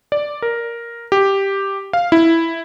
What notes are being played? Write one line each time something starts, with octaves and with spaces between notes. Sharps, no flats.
D5
A#4
G4
F5
E4